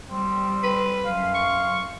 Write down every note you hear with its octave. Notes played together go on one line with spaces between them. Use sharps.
G3 C4
B4
F#2 F5 C6
C#6